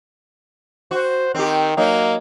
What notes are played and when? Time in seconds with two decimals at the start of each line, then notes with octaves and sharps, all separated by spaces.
0.91 F#4 C5
1.35 D#3 C4 G4
1.77 F#3 A#3 D#4